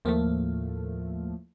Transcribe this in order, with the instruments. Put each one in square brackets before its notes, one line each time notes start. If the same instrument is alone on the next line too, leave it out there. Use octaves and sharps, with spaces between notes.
[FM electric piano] D#2 A#3 [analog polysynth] A2 F3 A3